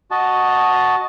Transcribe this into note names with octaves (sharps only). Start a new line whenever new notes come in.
F#4 D#5 A5